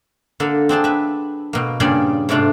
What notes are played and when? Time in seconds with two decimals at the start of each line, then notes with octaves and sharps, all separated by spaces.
0.40 D3 A#3 A4
0.69 C4 D4 G#4 A5
0.84 B4 E5
1.53 B2 A#3
1.80 G2 A#2 C#3 G3 G#4 D5
2.29 G#2 C3 A3 D4 F4